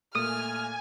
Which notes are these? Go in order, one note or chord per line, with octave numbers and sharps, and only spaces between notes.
A#2 A3 A#3 G#5 D#6 F6 D#7